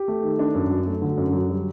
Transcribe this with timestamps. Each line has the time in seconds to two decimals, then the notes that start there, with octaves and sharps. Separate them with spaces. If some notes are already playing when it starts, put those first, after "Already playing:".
Already playing: G4
0.08 A3
0.23 D#3
0.39 D4
0.55 F#2
0.70 F#3
0.86 A3
1.02 D3
1.18 F#2
1.33 F#3
1.49 G3